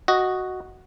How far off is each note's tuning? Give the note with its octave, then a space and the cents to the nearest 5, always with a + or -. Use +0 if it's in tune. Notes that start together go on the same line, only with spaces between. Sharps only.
F#4 +0 D#5 +0